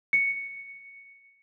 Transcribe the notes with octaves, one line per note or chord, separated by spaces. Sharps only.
C#7